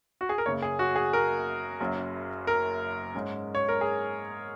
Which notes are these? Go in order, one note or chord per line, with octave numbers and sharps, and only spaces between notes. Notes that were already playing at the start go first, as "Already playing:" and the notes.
F#4
G#4
A#4
F#1 F#2 C#3 A#3 C#5
G#4
F#4
G#4
A#4
F#1 F#2 F#3
A#4
G#2 G#3 C#4
C#5
A#4
G#4